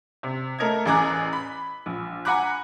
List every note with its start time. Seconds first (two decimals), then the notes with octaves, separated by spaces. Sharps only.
0.23 C3
0.59 A3 A4 A#4 D#5 G#6
0.85 A1 E2 G#4 A#5 D6 F#6
1.33 B5
1.86 A#1
2.25 F#5 G#5 A#5 B5 D6 F#6